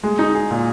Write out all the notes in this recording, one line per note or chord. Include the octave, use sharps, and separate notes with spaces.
G#3
D#4
G#4
A#2